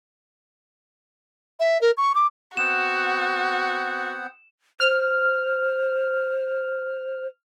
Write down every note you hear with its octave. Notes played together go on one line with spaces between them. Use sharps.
E5
A#4
C#6
D6
B3 C4 F#4 F#5 E7
C5 F6